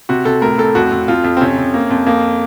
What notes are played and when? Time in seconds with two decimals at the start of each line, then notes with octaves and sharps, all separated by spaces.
0.09 C3 F#4
0.25 C3 A4
0.42 A2 A#4
0.58 A2 A4
0.75 F2 F#4
0.92 F2
1.08 F2 F4
1.24 F2
1.37 C4
1.41 C3 C#4
1.57 C3
1.74 A#3
1.90 F2
2.06 F2 A#3